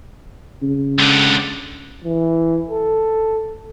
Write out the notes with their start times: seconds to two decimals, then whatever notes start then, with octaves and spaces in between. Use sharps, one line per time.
0.62 C#3
0.99 C#2 D3
2.04 E3
2.69 A4